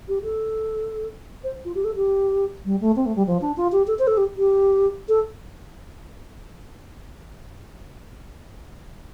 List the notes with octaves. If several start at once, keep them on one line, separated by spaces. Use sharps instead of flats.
G4
A4
C5
F4
G4
A4
G4
G3
A3
C4
A3
G3
F3
D4
F4
G4
A4
C5
A4
G4
G4
A4